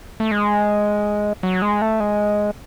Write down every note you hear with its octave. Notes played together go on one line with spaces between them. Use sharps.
A3
G#3
F#3
G#3
A3
G#3